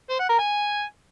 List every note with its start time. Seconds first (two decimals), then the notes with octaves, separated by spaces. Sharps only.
0.10 C5
0.20 F#5
0.29 A#4
0.39 G#5